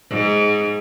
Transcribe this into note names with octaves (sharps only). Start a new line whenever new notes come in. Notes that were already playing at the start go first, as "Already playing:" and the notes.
G#2